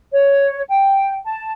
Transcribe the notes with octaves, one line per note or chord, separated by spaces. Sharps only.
C#5
G5
A5